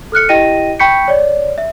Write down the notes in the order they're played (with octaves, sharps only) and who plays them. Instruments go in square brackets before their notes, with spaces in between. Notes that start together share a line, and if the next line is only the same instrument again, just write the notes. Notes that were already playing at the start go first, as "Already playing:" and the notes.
[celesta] A4 F6 F#6 C#7
E4 G4 D#5 G5 A#6 D#7
G5 B5 C#6 G6 B6 C#7
C#5 D5
E5